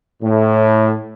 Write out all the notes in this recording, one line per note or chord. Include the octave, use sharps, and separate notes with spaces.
A2